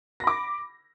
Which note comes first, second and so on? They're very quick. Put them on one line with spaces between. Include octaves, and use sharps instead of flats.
A#6 B5 D6